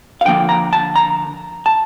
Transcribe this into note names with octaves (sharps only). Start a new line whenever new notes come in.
F5
D3 F3 A#3 G5
A#5
A5
A#5
A5